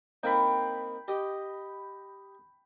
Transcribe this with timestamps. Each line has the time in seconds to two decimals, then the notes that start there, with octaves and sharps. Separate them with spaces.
0.23 A#3 C4 D#4 G5 B5
1.08 G4 D#5